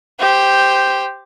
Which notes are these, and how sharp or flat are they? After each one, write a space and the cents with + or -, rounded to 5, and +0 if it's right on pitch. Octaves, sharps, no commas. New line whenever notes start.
G4 +0 C5 -5